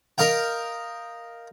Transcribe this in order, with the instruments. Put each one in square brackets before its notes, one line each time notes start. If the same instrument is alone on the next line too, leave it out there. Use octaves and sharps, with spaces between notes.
[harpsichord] A#4 D#5 F5 G5